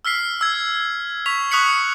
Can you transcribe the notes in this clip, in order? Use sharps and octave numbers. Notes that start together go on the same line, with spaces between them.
E6 F6 B6 C7
E6 G#6
C#6 B6 F7
C#6 D#6 F#6 B6 C#7 F#7